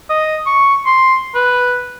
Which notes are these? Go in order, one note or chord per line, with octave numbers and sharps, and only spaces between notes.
D#5
C#6
C6
B4